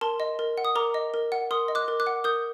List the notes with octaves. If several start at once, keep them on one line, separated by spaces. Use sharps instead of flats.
A#4 A5 C6
D#5
A#4
F#5
D#6
A#4 A#5 D6
D#5
A#4
F#5
A#4 C6 D#6
D#5
D6 F#6
A#4
D6 F#6
F#5
A#4 D#6 G6